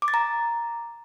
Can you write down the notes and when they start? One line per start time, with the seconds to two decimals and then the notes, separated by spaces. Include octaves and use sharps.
0.02 D6
0.08 A6
0.14 A#5